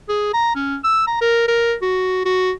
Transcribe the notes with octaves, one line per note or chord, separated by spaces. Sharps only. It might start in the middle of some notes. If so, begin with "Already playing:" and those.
G#4
A#5
C#4
E6
A#5
A#4
A#4
F#4
F#4